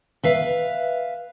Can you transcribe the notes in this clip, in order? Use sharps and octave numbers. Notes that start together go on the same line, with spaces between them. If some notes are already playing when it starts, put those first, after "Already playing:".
B4 E5 F5